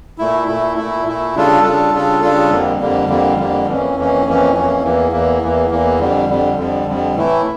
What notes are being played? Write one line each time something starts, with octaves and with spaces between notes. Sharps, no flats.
A#2 A3 E4
A#2 A3 E4
A#2 A3 E4
A#2 A3 E4
C#3 G3 D4 F4 A4
C#3 G3 D4 F4 A4
C#3 G3 D4 F4 A4
C#3 G3 D4 F4 A4
F2 D3 G3 A#3
F2 D3 G3 A#3
F2 D3 G3 A#3
F2 D3 G3 A#3
F2 E3 A#3 C#4
F2 E3 A#3 C#4
F2 E3 A#3 C#4
F2 E3 A#3 C#4
E2 E3 A#3
E2 E3 A#3
E2 E3 A#3
E2 E3 A#3
F2 D3 G3
F2 D3 G3
F2 D3 G3
F2 D3 G3
A2 E3 A3 E4